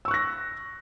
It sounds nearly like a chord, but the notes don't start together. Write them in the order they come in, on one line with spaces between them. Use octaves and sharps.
E6 C#6 F#6 A#6